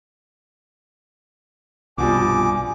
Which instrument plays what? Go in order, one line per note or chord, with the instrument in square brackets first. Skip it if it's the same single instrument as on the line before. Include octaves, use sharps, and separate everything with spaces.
[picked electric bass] C2 G2 [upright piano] B2 F3 G3 [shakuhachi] G#5 [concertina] D6